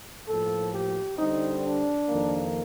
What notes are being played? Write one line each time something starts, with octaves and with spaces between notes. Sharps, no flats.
A2 F3 A#3 A4
G4
D3 G3 C4 D#4
D4
F2 D#3 A#3